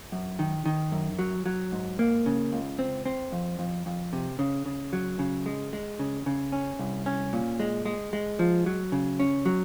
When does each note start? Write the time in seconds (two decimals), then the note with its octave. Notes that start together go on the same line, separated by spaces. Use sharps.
0.12 F#2
0.39 D#3
0.66 D#3
0.92 F#2
1.19 F#3
1.46 F#3
1.72 G#2
1.99 A#3
2.26 C#3
2.53 C#2
2.79 C4
3.06 C4
3.32 F2
3.59 F2
3.86 F2
4.13 C3
4.39 C#3
4.66 C#3
4.93 F#3
5.19 C#3
5.46 G#3
5.73 G#3
5.99 C#3
6.26 C#3
6.52 C#4
6.79 C2
7.06 C#4
7.33 A#2
7.60 G#3
7.85 G#3
8.13 G#3
8.39 F3
8.66 F#3
8.92 C#3
9.20 C#4
9.46 F#3